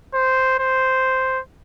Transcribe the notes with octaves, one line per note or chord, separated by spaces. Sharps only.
C5
C5